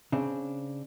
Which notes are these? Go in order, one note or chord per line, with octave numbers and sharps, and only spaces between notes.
C#3 C4 D4